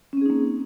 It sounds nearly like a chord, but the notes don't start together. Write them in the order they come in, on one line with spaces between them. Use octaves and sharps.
C#4 C4 G#4 D#4 A#3